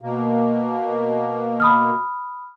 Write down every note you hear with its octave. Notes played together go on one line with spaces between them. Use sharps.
B2 A#3
B5 D#6 F6